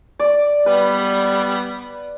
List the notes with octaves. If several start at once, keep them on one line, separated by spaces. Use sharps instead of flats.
D5
G3 B3 B4